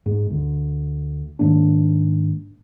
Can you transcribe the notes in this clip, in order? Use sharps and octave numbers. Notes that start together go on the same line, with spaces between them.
G#2
D2
G#2 D#3 A#3 D4